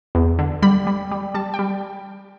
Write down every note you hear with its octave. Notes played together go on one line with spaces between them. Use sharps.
E2
D3
G3 B5
G3
G3
G3 A5
G5
G3